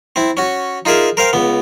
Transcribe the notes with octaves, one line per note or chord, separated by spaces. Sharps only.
C4 E4
C#4 F#4
D#4 F4 G#4 A#4 E5
A#4 C5 F5 G5
C#2 B3